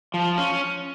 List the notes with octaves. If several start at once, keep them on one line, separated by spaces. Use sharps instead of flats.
F3
C#4